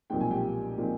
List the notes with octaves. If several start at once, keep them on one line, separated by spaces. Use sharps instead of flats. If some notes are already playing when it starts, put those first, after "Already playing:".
B1 A#2 F3 G#3 C4 G5
G#5
G4 G5
A#2 F3 G#3 C4